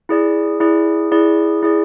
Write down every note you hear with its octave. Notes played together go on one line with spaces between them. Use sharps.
E4 G#4 D5
E4 G#4 D5
E4 G#4 D5
E4 G#4 D5